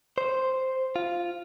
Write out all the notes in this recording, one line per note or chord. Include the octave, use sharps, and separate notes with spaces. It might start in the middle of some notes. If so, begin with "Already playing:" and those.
C5
F4